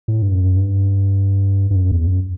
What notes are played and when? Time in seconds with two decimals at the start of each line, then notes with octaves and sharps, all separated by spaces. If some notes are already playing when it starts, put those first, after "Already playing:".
0.08 A2
0.22 G2
0.32 F#2
0.57 G2
1.71 G2
1.75 F#2
1.91 E2
2.07 F#2